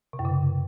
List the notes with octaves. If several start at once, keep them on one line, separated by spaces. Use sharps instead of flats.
C3
F#2
C#3